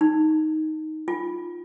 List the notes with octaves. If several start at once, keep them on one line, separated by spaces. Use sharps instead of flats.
D#4
F4